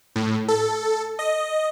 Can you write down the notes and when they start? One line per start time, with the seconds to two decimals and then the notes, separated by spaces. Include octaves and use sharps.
0.16 A2
0.48 A4
1.19 D#5